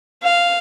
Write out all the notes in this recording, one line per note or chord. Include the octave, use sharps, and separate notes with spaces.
F5